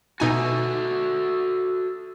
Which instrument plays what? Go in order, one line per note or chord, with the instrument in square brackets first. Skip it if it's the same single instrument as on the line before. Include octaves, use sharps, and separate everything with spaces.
[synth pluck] B2 D#4 G#5 [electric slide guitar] F#4 A4 E5